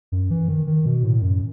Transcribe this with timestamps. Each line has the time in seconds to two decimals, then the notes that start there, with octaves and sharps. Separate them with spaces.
0.12 F#2
0.30 E3
0.48 D#3
0.67 D#3
0.86 B2
1.04 A2
1.22 F#2